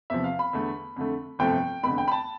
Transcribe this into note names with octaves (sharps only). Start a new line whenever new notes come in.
E2 C3 F3 E5
F5
B5
E2 D3 A3
F2 D3 A3
G1 F2 C3 F3 A3 G5
F1 E2 D3 B5
G5
B5
A5